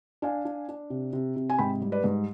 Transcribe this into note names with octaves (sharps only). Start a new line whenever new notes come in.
D4 F5 G#5
D4
D4
C3
C3
C3
G#5
G#2 G5 B5
G3
B4 D5
G#2